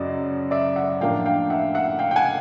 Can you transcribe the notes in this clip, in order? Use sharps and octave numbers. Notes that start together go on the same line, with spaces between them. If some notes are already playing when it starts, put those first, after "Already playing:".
Already playing: F#2 C#3 F#3 D5 D#5
D5 E5
E5 F#5
A2 F3 A#3 D4 F5 G5
F5 G5
E5 F#5
E5 F#5
F5 G5
G5
F#5 G#5